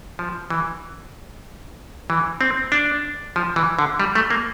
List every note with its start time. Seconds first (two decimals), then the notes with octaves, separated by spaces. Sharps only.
0.19 F3
0.50 E3
2.10 E3
2.41 C4
2.72 D4
3.36 F3
3.56 E3
3.79 D3
4.00 G3
4.15 A3
4.30 A#3